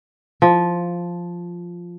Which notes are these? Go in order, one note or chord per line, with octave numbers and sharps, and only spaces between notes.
F3